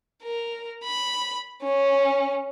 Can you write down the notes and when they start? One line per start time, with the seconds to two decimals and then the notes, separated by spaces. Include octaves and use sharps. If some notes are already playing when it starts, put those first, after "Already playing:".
0.23 A#4
0.84 B5
1.62 C#4